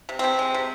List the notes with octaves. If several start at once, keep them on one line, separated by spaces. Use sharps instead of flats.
C3
C3 C4
G#3
C3